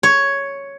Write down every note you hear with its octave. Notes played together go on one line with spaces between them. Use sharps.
C#5